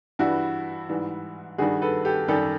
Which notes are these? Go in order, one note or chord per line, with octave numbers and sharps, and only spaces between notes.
G2 E3 G3 E4 F#4
G#2 E3 G3
G2 D#3 G3 F#4 G#4
A4 B4
G4 A4
F#2 D#3 G3 G4 A4